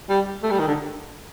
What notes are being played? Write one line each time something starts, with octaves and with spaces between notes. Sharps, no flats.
G3
A3
G3
D#3
D3